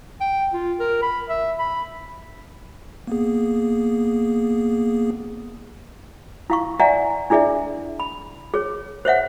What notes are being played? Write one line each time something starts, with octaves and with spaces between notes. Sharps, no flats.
G5
F4
A#4
B5
E5
B5
A#3 B3 G#4
E4 F5 C#6
D5 E5 F#5 G#5 A#5
D4 E4 G#4 D5 E5
B5
G#4 C#5
C5 C#5 E5 F#5